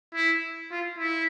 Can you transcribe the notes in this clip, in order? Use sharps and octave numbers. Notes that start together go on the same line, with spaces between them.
E4
F4
E4